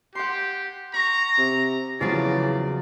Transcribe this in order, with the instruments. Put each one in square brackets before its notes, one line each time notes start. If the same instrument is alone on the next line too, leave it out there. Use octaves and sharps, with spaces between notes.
[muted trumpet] G4 [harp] F#5 C6
[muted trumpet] A#5 [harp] C#6
[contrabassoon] C3
[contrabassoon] E2 [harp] C#3 F3 F#3 [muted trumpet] D5